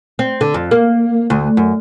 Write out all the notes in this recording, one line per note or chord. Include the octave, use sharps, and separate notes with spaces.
C4
D3
F2
A#3
D2
F#2